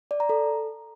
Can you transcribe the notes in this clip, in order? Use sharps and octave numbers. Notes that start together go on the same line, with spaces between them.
D5
A#5
A4